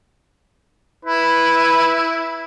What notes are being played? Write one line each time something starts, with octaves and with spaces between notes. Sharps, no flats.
E4 B4